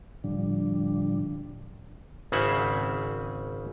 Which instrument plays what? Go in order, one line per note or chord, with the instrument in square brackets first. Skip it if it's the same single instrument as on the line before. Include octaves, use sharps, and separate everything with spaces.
[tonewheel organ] A2 D3 F3 G3 D4
[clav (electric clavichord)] G#1 C#3 C4 G#4 E5 F#5